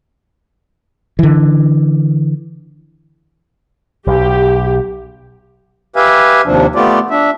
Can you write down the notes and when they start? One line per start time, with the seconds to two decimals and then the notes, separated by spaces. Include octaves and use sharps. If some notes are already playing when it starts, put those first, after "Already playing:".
1.19 D3 E3
4.07 B1 G4
5.96 G4 B4 E5 F5 G#5
6.45 D#2 C3 F3 D4
6.75 A3 B3 F4 G4 D5
7.10 D4 E5